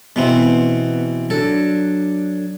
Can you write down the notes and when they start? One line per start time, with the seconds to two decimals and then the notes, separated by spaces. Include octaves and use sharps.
0.16 B2 E3 B3 C4
1.30 F#3 D4 A4